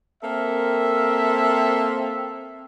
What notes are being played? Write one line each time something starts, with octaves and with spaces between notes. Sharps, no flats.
A#3 C4 A4 A#4 E5